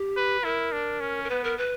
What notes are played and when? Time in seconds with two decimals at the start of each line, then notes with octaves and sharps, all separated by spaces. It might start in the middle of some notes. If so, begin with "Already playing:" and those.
Already playing: G4
0.16 B4
0.44 E4 A#4
0.72 D4
1.01 C#4
1.24 A#4
1.29 B3 B4
1.44 A#4
1.58 B4